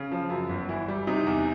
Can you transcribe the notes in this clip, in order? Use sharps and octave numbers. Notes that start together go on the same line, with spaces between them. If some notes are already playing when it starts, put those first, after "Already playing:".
Already playing: C#3
F3
F#2
G1
E3 E4
G3
C3 D#4
E2